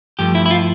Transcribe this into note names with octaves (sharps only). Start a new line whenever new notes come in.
G2 F3 A3 G4
E4
E4
F4